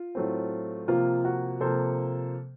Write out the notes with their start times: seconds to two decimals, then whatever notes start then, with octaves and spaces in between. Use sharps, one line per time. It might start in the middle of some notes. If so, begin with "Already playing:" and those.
Already playing: F4
0.15 A2 F#3 A3 C4
0.88 C3 F3 A#3 F4
1.25 F#4
1.61 C3 F3 A#3 A4 C5